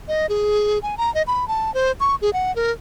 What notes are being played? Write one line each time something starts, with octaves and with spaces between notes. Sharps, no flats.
D#5
G#4
G#5
A#5
D#5
B5
A5
C5
C#6
G#4
F#5
A#4